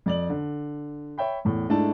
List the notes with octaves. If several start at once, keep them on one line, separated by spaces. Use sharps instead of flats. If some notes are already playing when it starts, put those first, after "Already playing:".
F2 D5 F#7
D3
C#5 E5 G5 B5
E2 A2
G#2 A3 D4 E4 A5